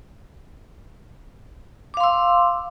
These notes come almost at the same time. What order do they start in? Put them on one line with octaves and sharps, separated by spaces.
D6 F5 C6 E6